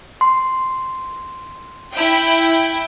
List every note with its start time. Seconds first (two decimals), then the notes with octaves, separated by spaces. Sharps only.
0.21 C6
1.93 E4 G5